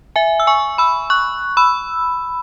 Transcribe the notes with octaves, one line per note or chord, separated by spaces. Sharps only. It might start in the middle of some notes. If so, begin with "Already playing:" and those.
E5 G#5
E6
G#5 C#6
B5 E6
C#6 F#6
B5 E6